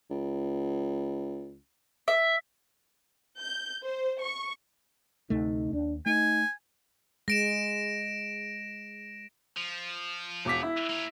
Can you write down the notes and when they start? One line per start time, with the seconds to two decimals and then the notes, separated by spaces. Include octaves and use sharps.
0.10 C#2
2.08 E5
3.40 G6
3.84 C5
4.22 C#6
5.30 D2 C3 A3 D#4
5.73 D#2 D4
6.06 A3 D#4 G#5
7.28 G#3 A#6 D7 E7
9.57 F3
10.45 E1 D6 B6
10.63 E4
10.90 A#3 C#5